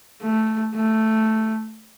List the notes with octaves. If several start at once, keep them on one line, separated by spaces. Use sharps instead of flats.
A3
A3